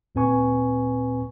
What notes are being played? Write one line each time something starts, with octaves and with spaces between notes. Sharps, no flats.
D2 A#2 C4 B4 G#5 C#6